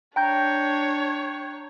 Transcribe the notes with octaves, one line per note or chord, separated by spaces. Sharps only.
D4 C#5 G5 A#5 G6